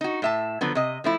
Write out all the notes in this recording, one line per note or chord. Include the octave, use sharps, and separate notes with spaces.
D#4 F#4
A2 E5 A5
D3 F3 F#3 B3
C3 D#5
F3 A3 E4